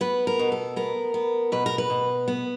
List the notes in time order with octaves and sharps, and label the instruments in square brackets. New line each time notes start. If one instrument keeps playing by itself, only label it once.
[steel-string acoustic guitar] B3 B4
A#4
B2
A4
B3 A#4
B3
B2 B4
A#4
B4
B2
B3